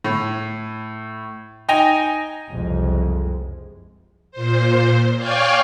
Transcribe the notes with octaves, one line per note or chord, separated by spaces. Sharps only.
A2
D#4 G5 G#5 A#6 F7
F#1 C2 F2 G#3
A#2 C5
C#5 D5 F5 G5 G#5 C#6